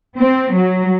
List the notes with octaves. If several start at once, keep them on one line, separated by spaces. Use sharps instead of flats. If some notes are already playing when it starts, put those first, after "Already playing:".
C4
F#3